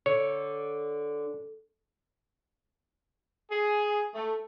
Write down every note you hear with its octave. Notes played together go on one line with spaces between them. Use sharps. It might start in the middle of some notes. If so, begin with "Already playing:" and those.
D3 C#5
G#4
A3